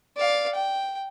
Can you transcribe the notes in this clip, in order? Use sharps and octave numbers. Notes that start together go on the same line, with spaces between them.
D5 F5
G5